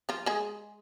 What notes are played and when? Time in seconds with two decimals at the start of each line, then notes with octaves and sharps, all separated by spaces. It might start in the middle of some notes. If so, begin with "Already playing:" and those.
0.09 F3 F4
0.26 G#3 G#4